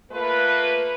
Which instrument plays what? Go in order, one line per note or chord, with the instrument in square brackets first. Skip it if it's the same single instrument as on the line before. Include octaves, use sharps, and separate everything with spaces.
[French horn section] A3 A#3 F4 B4